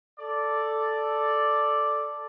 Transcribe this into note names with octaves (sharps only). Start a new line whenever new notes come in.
A4 D5